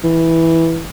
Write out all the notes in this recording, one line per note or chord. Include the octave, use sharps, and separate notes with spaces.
E3